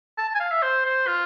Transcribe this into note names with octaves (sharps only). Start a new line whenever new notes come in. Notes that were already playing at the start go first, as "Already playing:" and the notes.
A5
A5
G#5
F5
E5
C5
C5
F4